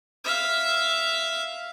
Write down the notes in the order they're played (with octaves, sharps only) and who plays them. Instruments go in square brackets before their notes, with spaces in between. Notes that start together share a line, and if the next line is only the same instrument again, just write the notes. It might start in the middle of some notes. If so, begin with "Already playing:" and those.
[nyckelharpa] E5 F5